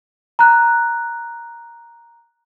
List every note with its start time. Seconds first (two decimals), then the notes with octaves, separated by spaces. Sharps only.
0.39 A#5 F#6